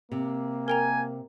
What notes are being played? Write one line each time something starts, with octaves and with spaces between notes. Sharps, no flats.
C3 A#3
A#4 G5 G#5 A#5